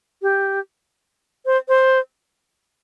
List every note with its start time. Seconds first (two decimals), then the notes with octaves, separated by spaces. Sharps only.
0.22 G4
1.46 C5
1.68 C5